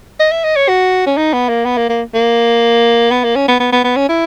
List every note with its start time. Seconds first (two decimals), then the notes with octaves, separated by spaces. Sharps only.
0.20 D#5
0.32 E5
0.44 D#5
0.56 C#5
0.68 F#4
1.06 C#4
1.17 D#4
1.33 B3
1.49 A#3
1.65 B3
1.77 A#3
1.89 A#3
2.14 A#3
3.11 B3
3.24 A#3
3.36 C#4
3.48 B3
3.60 B3
3.72 B3
3.84 B3
3.96 C#4
4.09 E4